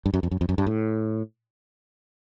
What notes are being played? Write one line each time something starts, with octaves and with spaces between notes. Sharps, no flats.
G2
F#2
F2
F#2
F2
F#2
G2
A2